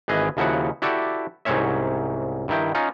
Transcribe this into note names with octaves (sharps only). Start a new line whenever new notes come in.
G#1 E3 G#4 B4 D#5
D#2 C#3 F3 E4 F#4 F#5
E4 F#4 G4 A4 D5 E5
C2 G#2 C4 C#4 C#5 E5
G2 D#3 E4 G5
C#4 D#4 F4